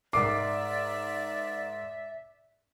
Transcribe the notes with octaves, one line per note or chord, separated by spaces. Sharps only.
G#2 A#4 D5 E5 D6 C7